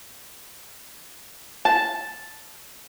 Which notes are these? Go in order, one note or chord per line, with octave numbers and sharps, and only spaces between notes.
A5